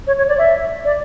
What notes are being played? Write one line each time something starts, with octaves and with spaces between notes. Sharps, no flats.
C#5
C#5
D5
E5
D5